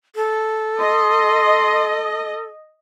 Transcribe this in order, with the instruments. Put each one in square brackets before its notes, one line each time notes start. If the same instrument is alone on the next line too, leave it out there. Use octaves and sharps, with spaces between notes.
[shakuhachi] A4
[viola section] D#5 [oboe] C6